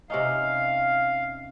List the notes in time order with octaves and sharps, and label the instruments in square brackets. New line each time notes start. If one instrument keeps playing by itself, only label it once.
[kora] C3 C#4 D#4 [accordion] F5